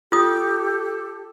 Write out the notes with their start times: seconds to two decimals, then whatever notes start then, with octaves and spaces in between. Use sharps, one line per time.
0.12 F4 G4 A4 D#6